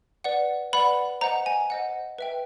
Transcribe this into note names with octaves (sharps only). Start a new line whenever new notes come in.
B4 D5 F#5
B4 D5 F#5 B5
C5 D#5 F#5 A#5
G#5
C5 D#5 F#5
B4 E5 G5